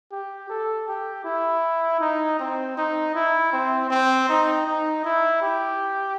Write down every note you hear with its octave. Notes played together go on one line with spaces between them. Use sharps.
G4
A4
G4
E4
D#4
C4
D#4
E4
C4
C4
D#4
D#4
E4
G4